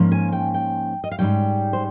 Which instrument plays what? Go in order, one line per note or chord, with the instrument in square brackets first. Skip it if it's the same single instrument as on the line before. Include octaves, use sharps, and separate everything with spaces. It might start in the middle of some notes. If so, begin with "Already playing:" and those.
Already playing: [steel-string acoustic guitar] G#2 F3 A#3 C#4
G#5
G5
G5
D#5
F5
G#2 D#3 G3 C#4 G5
C5